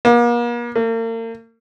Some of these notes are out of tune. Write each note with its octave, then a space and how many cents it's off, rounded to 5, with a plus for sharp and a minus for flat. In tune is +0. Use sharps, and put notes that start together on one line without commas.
A#3 +40
A#3 -40